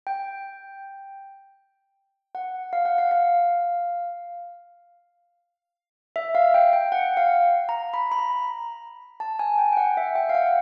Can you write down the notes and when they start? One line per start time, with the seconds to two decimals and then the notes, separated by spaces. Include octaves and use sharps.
0.07 G5
2.35 F#5
2.73 F5
2.85 F#5
2.98 F5
3.11 F5
6.16 E5
6.35 F5
6.54 G5
6.73 G5
6.92 F#5
7.17 F5
7.69 A#5
7.94 B5
8.12 B5
8.19 A#5
9.20 A5
9.39 G#5
9.58 G5
9.73 G5
9.77 F#5
9.97 E5
10.15 G5
10.29 F5
10.35 F#5